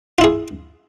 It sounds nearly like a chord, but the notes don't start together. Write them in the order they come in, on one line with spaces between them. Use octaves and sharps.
F4 E4 G#4